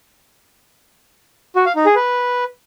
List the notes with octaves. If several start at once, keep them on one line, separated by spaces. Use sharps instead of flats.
F#4
F5
D#4
G#4
B4